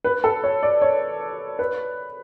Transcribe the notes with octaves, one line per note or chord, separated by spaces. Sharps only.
B4
A4
C#5
D5
C#5
B4